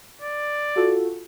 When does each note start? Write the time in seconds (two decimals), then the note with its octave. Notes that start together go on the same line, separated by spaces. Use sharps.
0.22 D5
0.76 F4 F#4 A4